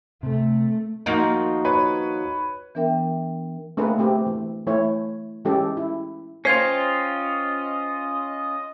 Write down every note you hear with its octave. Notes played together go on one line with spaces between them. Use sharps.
C3 A3
D#2 F3 A#3 D#4 F#4
B4 C#5
E3 B3 D4 A#4 E5 G5
A3 A#3 C4 D4 G#4 B4
A3 C4 G4
E3
E3 A3 E4 C#5
E3 G#3 C#4 G4 A4
E4
C#4 F4 C5 D#5 F5 G5 G#6 C7